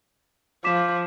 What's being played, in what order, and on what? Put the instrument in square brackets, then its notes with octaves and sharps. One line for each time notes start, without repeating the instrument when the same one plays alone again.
[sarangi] F3 [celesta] D6 B6 E7